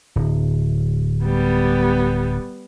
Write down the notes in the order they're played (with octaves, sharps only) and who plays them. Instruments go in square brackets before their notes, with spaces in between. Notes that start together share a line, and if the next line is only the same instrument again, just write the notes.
[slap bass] D1
[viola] G3 B3